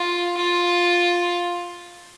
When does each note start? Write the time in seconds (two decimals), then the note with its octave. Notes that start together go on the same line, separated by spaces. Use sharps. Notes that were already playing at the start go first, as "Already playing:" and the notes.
Already playing: F4
0.37 F4